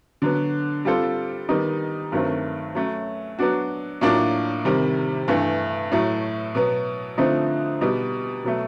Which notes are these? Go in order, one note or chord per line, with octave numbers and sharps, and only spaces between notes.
D3 F#3 B3
G3 C4 F4 A4 C5
D#3 G3 B3 D#4
G2 D#3 F#3 A3 C4
F#3 A3 C#4
F#3 B3 D4 F#4
A2 F#3 A#3 D4 F4
C3 D#3 G3
G2 E3 A3
A2 F#3 A3
B2 F#3 B3
D3 F3 A3 C4 D#4
B2 G3 B3 D#4
B2 F#3 A3